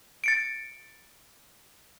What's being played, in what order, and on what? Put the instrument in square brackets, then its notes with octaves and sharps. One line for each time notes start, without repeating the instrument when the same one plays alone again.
[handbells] A6 C#7 D7